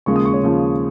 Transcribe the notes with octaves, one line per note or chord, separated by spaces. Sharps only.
D#2 C#3 F3 G#3 C#6
D#6
C#6
C#5
D#2 C#3 F3 G#3